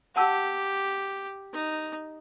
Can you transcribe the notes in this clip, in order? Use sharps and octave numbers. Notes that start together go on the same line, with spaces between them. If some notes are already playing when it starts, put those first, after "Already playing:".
G4 F#5 A5 E6
D#4